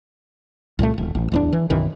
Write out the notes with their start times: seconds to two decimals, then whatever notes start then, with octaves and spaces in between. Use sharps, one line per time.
0.79 C2 A#2 G3 A3
0.98 D#1
1.15 A1
1.32 D1 E2 D4
1.53 E3
1.70 B1 F#2 D#3 E3